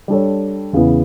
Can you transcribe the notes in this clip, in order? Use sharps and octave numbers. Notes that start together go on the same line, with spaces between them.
G3 D4 A4 C#5
E2 C#3 E3 B3 E4